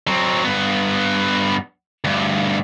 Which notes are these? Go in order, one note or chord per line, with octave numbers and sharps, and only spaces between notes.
F#3 C4
G2 B3
D2 G2